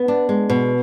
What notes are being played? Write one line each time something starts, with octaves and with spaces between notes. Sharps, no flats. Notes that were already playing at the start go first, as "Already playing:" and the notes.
Already playing: B3
D4
G#3
B2